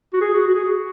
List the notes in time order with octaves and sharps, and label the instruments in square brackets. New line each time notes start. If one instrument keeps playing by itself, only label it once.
[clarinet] F#4
G#4
F#4
F#4
G#4
F#4